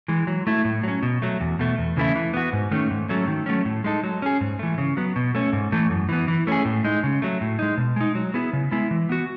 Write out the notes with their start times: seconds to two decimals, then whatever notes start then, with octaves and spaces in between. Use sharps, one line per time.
0.08 E3 G#3
0.27 F#3
0.47 A3 E4
0.65 A2
0.83 F#3 C#4
1.03 B2
1.22 F#3 A3
1.40 E2
1.59 B2 A3
1.78 E2
1.97 C#3 E3 A3 E4
2.16 E3
2.34 B3 F#4
2.53 G#2
2.71 D#3 A3 C#4
2.91 G#2
3.09 F#3 A3 C#4
3.28 D#3
3.46 F#3 A3 C#4
3.65 A2
3.84 G#3 D#4 A4
4.04 F#3
4.22 C#4 G#4
4.41 G#2
4.59 E3 A3
4.78 C#3
4.97 F#3 B3
5.16 B2
5.35 A3 C#4
5.53 G#2
5.72 E3 A3
5.90 F#2
6.09 E3 B3
6.28 E3
6.47 A3 C#4 G#4
6.65 A2
6.84 G#3 D#4
7.04 C#3
7.22 F#3 A3
7.41 A2
7.59 G#3 D#4
7.78 B2
7.96 G#3 D#4
8.15 F#3
8.34 B3 E4 G#4
8.53 C#3
8.71 G#3 B3 E4
8.91 E3
9.09 B3 F#4